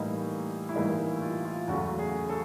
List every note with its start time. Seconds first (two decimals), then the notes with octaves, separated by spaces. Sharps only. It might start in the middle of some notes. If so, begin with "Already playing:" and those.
Already playing: A2 E3 G3 A#3 D#4
0.69 E4
0.75 A2 E3 G3 A#3 D#4
1.22 F4
1.45 F4
1.68 E2 C#3 F#3 A3 F#4
1.99 G#4
2.29 A4